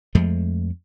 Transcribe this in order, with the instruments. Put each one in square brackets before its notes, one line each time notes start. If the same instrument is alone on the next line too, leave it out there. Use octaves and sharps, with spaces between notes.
[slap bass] F2 F3 G#3 A3